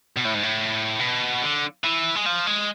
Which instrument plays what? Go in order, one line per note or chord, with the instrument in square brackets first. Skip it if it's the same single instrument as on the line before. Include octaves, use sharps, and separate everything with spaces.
[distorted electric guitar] B2
A2
G#2
A2
B2
D3
E3
G#3
F3
G#3